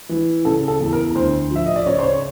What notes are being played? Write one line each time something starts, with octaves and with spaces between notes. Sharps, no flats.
E3
C#3 A4
A4
E2
A#4
D2 C5
F3 E5
D#5
D5
C#3 C#5
C5
C#5